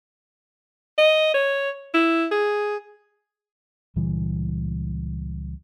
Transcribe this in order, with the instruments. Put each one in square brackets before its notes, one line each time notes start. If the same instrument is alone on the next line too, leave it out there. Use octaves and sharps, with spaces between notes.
[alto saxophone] D#5
C#5
E4
G#4
[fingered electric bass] C#2 A#2 E3 G3